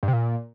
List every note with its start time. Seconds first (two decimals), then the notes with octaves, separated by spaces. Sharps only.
0.03 G2
0.08 C3
0.13 A#2